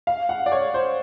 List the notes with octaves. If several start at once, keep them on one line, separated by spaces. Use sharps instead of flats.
F5
F#5
D5
C#5
C5